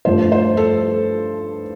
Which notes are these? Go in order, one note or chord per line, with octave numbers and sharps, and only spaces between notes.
G2 F3 A3 C5
C5
A4